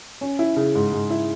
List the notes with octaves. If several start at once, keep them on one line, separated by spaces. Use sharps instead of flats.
C#4
E4
C#3
G#2
G#2
E4